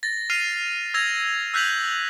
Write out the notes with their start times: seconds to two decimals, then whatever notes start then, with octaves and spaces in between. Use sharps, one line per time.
0.03 A6 A#6
0.30 F6 C7 D#7 F7
0.94 E6 G#6 A#6 F7
1.54 E6 F#6 G6 B6 F7 F#7